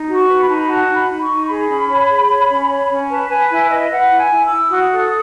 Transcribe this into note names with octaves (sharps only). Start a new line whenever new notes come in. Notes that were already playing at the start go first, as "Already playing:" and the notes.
Already playing: D#4
F#4
C#6
B4
B5
D#4 A5
B5
F#4 A5
D#4
B5
D#4
C#6
D#4
C#6
G#4 B5
C#4
C#5
G#4
C#5
C#4
C#5
C#4
B4 A5
B4 G#5
E4 G#5
B4 D#5
B4 F#5
E4
G#5
E4
E6
E4
F#4 D#6
A4